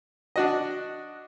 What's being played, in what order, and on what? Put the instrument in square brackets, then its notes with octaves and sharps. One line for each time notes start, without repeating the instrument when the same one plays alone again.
[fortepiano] D4 F#4 D#5